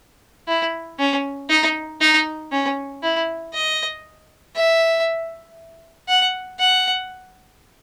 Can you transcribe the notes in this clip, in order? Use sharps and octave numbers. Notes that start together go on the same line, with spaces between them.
E4
C#4
D#4
D#4
C#4
E4
D#5
E5
F#5
F#5